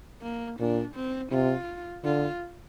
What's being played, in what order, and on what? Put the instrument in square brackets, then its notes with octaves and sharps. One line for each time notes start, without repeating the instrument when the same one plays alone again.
[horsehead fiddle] A#3
[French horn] A#2 [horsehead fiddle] D4
[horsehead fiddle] C4
[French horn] C3 [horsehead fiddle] F4
[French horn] D3 [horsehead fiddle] F4